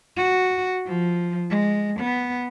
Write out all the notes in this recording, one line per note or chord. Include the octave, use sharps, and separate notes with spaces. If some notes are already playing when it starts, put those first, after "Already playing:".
F#4
F3
G#3
B3